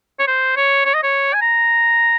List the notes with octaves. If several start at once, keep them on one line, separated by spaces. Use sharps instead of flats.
C#5
C5
C#5
C#5
D#5
C#5
G#5
A#5